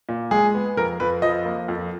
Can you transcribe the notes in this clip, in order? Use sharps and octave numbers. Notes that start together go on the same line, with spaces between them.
A#2
G#3 G#4
B3
F2 A#4
F2 B4
F3 D#5
A#3
F2